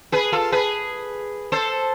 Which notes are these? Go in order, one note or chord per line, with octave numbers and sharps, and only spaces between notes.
G#4 B4
F4 A4
G#4 B4
A4 C5